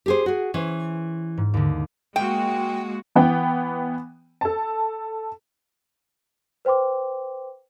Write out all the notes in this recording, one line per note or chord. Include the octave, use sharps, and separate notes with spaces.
G4 G#4 C5
F#4 G#4
E3 C#4 C5
G#2
D#2 D3
G#3 A#3 F#4 G5
E3 B3 G5
A4 A5
B4 C5 G5 C6 D6